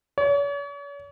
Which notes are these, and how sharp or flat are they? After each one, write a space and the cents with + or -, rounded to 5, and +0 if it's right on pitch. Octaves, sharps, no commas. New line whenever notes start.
C#5 +40